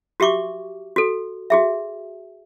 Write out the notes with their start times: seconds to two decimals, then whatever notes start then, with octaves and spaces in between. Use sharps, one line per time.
0.20 F#4 G4 E5 C#6 D6
0.96 F#4 A4
1.50 F#4 G#4 E5